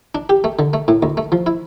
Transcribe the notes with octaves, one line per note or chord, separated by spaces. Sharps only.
D4
G4
A3
D3
A3
A2
D2
A3
F3
E4